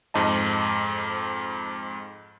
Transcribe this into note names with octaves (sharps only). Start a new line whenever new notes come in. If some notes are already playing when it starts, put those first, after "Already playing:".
F2 G#2 D#5 A5